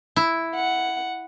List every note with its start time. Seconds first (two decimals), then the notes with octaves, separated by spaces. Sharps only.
0.16 E4
0.56 F#5